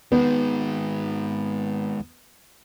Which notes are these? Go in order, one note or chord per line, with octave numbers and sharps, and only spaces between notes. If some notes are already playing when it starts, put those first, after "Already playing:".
D#3 G#3 B3